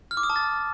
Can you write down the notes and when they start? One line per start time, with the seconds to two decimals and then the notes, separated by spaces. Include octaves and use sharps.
0.11 F6
0.17 D6
0.23 D#6
0.30 A5
0.36 A6